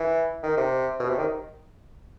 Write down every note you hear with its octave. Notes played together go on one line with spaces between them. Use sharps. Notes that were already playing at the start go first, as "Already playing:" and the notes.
Already playing: E3
D#3
C3
B2
C3
D#3